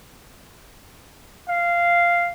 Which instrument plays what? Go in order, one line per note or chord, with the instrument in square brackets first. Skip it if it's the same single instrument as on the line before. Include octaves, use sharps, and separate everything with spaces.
[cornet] F5